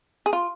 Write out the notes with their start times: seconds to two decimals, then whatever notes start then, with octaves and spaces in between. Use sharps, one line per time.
0.26 G#4
0.33 F4